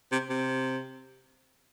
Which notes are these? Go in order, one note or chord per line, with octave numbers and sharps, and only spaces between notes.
C3
C3